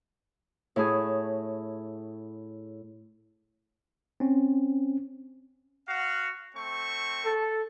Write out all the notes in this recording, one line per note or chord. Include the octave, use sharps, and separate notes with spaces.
A2 E4 G#4 C#5
C4 C#4
F#4 F5 F#5
A3 C4 C#6
A4